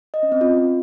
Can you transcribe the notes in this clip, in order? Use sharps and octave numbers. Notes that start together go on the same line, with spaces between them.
D#5
C#4
C4
F4